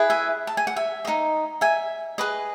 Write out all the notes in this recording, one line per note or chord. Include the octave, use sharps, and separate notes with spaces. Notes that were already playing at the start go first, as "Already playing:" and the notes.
Already playing: E4 G#4 B4
E5 G#5
A5
G#5
F#5
E5 G#5
D#4 A4 D#5
E5 G#5
G#4 B4 D#5